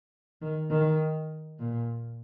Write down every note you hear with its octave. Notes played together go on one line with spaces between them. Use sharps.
D#3
D#3
A#2